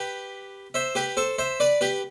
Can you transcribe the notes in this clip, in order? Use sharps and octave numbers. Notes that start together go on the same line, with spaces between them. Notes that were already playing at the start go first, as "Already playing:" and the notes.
Already playing: G4 B4
C5 E5
G4 B4
A4 C5
C5 E5
B4 D5
G4 B4